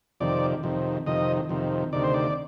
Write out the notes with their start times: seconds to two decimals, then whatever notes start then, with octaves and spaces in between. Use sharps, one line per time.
0.20 F2 C3 D#3 D5
0.63 F2 C3 D#3
1.07 F2 C3 D#3 D#5
1.49 F2 C3 D#3
1.93 D2 C3 D#3 D5
2.04 C5
2.14 D5